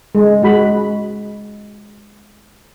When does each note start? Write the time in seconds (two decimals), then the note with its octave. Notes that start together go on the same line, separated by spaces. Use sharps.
0.15 G#3
0.43 G#3 F#4 B5